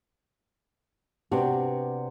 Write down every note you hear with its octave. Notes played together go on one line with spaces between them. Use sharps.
C3 B3 C4 D4 F#4 G4